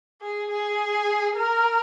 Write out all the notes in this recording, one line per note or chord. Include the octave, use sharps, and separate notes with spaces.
G#4
G#4
A#4